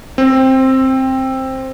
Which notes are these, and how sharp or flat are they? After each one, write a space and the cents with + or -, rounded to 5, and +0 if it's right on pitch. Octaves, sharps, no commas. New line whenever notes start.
C4 +10